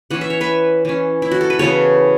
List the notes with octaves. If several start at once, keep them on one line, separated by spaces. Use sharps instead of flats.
E3 C#4 F#5
E5
C#5
B4 E5
E3 C#4
E4
F#4
A4
B4
C#3 E3 B3 A4 C#5